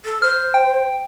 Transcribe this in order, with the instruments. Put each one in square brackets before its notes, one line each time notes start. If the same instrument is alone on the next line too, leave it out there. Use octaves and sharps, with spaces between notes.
[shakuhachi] A4
[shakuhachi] C5 [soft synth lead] F6
[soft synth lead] G5